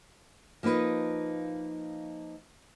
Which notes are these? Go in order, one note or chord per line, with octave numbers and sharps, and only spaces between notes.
F3 A#3 D#4 B4 D#5